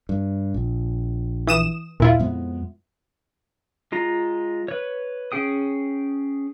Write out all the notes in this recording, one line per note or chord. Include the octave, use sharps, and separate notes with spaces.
G2
A#1
E3 D#6 E7
D#2 A#2 E4 F4
F2 G#3 B3
G#3 F4 A#5
B4 C#5
C#4 G#4 G5 D#6